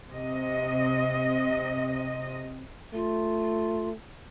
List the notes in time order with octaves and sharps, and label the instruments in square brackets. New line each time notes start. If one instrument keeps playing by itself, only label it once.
[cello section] C3 D#5
[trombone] A3 [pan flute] F4